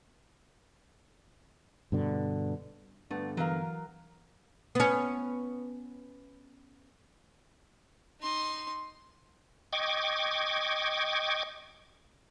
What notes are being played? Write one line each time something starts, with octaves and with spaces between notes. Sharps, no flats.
G2 B2 D3
G2 D3 A3 B3
E3 F#3 A#4 F5
B3 C#4
D#4 C6
D#5 G5 C#6 D6 G#6